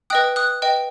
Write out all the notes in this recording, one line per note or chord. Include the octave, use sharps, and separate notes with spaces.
B4 D#5 G5 D#6 F#6
D#6 F#6
B4 D#5 G5